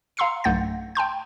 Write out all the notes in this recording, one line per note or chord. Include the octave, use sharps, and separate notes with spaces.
F5 A#5 C6 E6 C7 C#7
B1 G2 A3 F#5 G6 A6
G5 A5 C6 G6